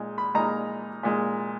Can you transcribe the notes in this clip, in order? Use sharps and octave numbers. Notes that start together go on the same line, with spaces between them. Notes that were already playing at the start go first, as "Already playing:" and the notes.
Already playing: A#2 G#3 D#4
B5
A#2 G#3 D#4 A#5
A#2 G#3 D#4